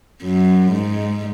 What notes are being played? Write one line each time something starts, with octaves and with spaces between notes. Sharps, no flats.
F#2
G#2